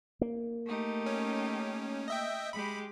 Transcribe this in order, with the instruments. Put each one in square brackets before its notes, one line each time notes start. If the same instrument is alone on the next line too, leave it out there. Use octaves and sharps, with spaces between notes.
[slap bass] A#3
[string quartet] A3 D#4 G4
[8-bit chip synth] C#4
D#5 E5 G5
[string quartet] G#3 G4 [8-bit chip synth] B5